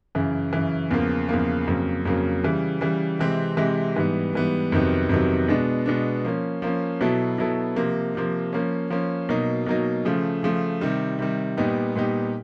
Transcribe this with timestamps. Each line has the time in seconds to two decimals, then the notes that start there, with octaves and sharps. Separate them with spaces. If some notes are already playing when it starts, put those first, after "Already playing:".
0.15 F#2 C#3 E3
0.53 F#2 C#3 E3
0.91 E2 C#3 F3 A#3
1.29 E2 C#3 F3 A#3
1.67 F2 C#3 F#3 A#3
2.05 F2 C#3 F#3 A#3
2.44 C#3 E3 G3
2.81 C#3 E3 G3
3.19 C3 E3 G#3 C4
3.57 C3 E3 G#3 C4
3.96 G#2 E3 G3 B3
4.33 G#2 E3 G3 B3
4.72 F2 C3 D#3 F#3 B3
5.09 F2 C3 D#3 F#3 B3
5.48 B2 G#3 B3 D4
5.86 B2 G#3 B3 D4
6.25 F3 A#3 C#4
6.62 F3 A#3 C#4
7.01 B2 F#3 B3 E4 A4
7.38 B2 F#3 B3 E4 A4
7.76 C3 F3 A#3
8.15 C3 F3 A#3
8.53 F3 A#3 C#4
8.90 F3 A#3 C#4
9.29 B2 F#3 A#3 D#4
9.67 B2 F#3 A#3 D#4
10.05 C#3 F3 A3
10.43 C#3 F3 A3
10.81 C3 D#3 G3
11.19 C3 D#3 G3
11.57 A#2 G3 B3 D#4 G4
11.96 A#2 G3 B3 D#4 G4